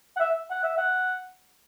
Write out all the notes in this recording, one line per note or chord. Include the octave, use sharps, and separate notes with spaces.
F#5
E5
F#5
E5
F#5